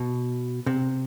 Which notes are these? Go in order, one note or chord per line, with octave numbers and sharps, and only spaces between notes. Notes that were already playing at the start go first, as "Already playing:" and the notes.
Already playing: B2
C3